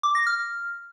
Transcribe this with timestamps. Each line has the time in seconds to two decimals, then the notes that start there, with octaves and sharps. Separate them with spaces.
0.03 D6
0.15 A#6
0.27 F6